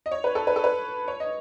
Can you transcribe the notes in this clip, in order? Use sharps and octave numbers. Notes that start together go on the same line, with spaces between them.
D#5
C#5
B4
A4
B4
A4
B4
C#5
D#5